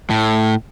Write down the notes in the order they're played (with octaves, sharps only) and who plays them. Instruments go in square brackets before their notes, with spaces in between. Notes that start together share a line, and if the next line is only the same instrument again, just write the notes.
[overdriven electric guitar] A2